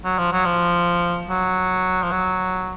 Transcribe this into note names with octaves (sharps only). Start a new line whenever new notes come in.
F#3
F3
F#3
F3
F#3
F3
F#3